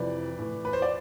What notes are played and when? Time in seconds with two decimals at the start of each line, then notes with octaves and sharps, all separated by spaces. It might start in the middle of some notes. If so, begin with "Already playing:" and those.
Already playing: F2 C3 E3 B4 D5
0.39 A2 E3
0.65 B4
0.73 C5
0.82 D5